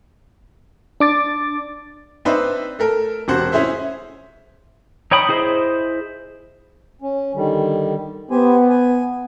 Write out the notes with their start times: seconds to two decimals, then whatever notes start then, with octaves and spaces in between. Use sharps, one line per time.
1.00 D4 D6 A6
2.25 C4 D4 D#4 B4 C5 E5
2.79 A3 A4 A#4
3.28 E1 C3 F#4 C5 F#5
3.52 C#4 E4 G#4 C5 E5
5.11 D#4 C#5 G5 B5 D#6
5.29 E4 G#4 C5 D#5
7.02 C#4
7.35 D3 D#3 G3
8.30 B3 G4 C5 G#5
8.70 G#5